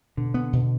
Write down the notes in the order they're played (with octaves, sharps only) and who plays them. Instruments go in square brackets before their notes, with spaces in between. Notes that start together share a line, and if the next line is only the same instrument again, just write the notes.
[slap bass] B2 [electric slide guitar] D3
[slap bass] B3
B2